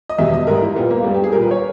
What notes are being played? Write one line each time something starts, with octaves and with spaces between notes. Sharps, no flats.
D#5
E2 B2 G3 E5
D#5
G#2 G3 A#4
E4
A#2 G3 B3
A#3
G2 G3 B3
G4
G#4
A#2 G3 A#4
B4
C#5